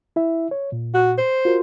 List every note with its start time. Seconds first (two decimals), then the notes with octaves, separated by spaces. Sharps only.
0.16 E4 E5
0.51 C#5
0.72 A#2
0.94 F#4
1.18 C5
1.45 F4 F#4 A#4